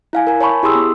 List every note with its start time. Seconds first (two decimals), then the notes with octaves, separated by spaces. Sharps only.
0.13 E4 F5 G#5
0.27 A#4 G#5
0.41 C#5 G#5 A5 B5 C#6
0.63 E4 G4 G#4 C6 D#6 E6
0.75 B3